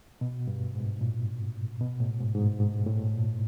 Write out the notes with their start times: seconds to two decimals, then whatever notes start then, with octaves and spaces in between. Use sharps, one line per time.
0.21 B2
0.47 G2
0.75 G#2
1.01 A#2
1.81 B2
2.00 A2
2.20 G#2
2.35 G#2
2.40 G2
2.60 G#2
2.86 A2
3.13 A#2